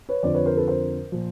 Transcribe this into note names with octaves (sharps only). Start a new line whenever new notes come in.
B4 C#5
F2 D3 F3 C5 D5
B4 C#5
A#4 C5
A4 B4
A#4 C5
A#2 F3